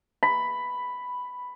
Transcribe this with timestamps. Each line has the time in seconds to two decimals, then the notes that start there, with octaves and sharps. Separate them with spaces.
0.23 B5